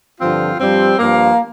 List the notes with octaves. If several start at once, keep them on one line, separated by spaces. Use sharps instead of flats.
G2 D3 F3 C4 F4
G2 F3 G3 C4
G2 F3 A#3